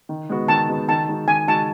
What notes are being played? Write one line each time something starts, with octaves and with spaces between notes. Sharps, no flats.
D#3
G#3 B3 F#4
D#3 A5
G#3 B3 F#4
D#3 A5
G#3 D#4 F#4
D#3 G#5
G#3 D#4 F#4 A5